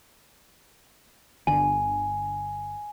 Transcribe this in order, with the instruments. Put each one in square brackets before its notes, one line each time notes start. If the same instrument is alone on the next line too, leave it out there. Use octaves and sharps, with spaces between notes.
[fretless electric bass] G1 D3 [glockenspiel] G#5